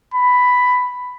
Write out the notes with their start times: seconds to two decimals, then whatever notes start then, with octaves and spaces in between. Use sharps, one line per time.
0.14 B5